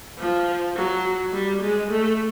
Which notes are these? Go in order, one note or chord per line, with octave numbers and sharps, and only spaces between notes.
F3
F#3
G3
G#3
A3